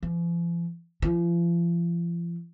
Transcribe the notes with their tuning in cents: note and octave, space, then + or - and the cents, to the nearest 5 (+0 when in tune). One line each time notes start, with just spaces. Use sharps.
F3 -45
F3 -40